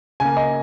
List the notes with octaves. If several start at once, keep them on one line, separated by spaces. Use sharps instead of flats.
C#3 A#3 G#5
D#5